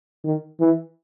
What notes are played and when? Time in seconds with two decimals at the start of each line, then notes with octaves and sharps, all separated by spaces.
0.24 D#3
0.60 E3